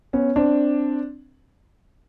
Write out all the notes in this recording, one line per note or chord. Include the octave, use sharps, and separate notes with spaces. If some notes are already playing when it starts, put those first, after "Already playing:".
B3 C#4
C4 D4